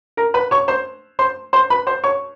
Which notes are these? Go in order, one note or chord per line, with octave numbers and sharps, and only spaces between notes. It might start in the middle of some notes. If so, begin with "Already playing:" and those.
A#4 A#5
B4 B5
C#5 C#6
C5 C6
C5 C6
C5 C6
B4 B5
C5 C6
C#5 C#6